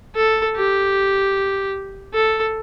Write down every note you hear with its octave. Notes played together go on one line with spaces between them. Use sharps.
A4
G4
A4